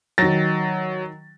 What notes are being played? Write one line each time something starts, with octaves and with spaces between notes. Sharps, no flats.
D#3 F#3 A6 A#6